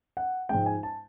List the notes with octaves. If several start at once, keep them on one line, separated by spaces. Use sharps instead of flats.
F#5
G#2 F3 G#3 G5
G#5
A5